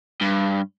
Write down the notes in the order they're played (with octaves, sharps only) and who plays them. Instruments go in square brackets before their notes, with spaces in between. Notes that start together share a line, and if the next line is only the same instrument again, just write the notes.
[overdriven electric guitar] G2